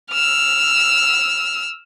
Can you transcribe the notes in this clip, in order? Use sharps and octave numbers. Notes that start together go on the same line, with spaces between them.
E6 F6